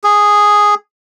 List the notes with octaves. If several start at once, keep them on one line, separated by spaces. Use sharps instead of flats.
G#4